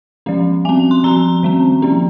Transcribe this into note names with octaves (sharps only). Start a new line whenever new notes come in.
F3 G#3 C#4
G3 C4 G#5
C6
F3 C4 A#5
D#3 G3 C4
F3 A#3 C#4